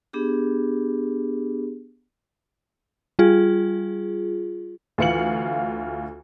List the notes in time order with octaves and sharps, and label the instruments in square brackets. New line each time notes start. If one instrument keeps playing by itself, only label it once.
[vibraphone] B3 D4 G4 G#4
[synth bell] G3 F4 G#4
[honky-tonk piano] D2 E3 F4 F5 C#7 F#7